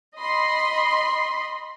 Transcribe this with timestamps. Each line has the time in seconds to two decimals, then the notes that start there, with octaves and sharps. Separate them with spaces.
0.18 D#5 B5 C6